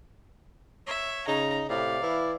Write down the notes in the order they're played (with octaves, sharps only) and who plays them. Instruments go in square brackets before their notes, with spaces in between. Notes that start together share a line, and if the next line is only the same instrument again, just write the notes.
[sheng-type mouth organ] C#5 [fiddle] E5
[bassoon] C#3 [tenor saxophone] D#4 [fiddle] A#5
[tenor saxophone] A2 [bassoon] C3 [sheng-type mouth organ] D5 [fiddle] F5
[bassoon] E3 [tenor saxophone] E4